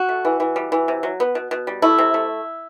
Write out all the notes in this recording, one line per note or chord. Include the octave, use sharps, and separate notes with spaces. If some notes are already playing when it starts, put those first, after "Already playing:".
Already playing: F#4
A3
E3
E3
G3
E3
C3
F#3
B3
B2
B2
G3
A3 E4
C3
A3